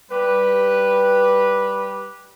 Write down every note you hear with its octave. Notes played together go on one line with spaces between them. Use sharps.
G3 G4 B4